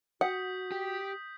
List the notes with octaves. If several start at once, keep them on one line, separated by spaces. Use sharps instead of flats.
F#4 F#5 D#6 G6 B6
G4